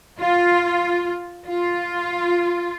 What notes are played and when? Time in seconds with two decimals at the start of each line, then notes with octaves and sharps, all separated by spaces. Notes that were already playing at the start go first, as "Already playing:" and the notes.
0.20 F4
1.48 F4